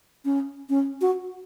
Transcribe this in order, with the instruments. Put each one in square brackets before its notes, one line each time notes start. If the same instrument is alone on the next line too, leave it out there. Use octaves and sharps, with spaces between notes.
[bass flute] C#4
C#4
F#4